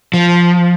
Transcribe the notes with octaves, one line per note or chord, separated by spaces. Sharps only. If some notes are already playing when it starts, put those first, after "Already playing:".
F3